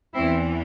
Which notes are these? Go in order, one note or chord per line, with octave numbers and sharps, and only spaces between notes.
E2 E3 C4 E4